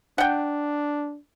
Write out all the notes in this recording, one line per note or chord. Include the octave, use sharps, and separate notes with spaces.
D4 F#5 G5